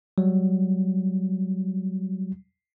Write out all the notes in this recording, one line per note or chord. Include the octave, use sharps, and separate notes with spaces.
F#3 G3